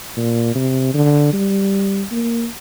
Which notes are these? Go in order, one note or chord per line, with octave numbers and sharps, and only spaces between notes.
A#2
C3
D3
G3
A#3